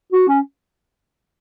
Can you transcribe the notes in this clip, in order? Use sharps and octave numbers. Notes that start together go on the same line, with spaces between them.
F#4
C#4